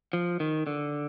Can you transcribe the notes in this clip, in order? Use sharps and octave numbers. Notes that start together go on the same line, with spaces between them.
F3
D#3
D3